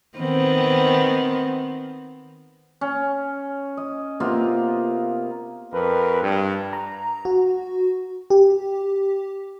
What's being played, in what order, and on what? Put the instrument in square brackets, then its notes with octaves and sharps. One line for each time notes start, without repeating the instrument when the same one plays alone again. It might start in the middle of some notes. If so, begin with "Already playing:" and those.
[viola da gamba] D#3 B3 C4
[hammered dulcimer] C#4
D#5
C3 A#3 B3 F4
[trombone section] F2 A#4 B4
G2
[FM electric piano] A#5
F#4
G4